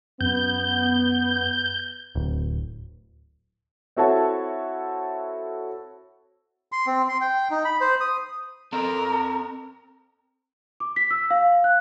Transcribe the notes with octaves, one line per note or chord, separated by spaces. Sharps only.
F#2 B3 G6
D1
C4 E4 F#4 A4 C#5 A5
C6
C4
C6
G5
D#4
B5
C5
D#6
C4 A4 A#4 F5
D6
B6
E6
F5
F#6